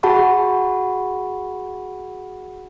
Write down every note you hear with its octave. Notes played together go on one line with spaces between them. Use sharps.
F#4 G#4 F#5 A5 B5 C#6